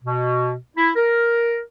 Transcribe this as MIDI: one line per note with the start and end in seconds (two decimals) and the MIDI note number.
0.03 0.56 47
0.76 0.90 64
0.96 1.60 70